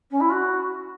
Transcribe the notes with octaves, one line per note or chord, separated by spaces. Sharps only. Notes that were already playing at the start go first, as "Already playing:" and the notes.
C#4
E4
F#4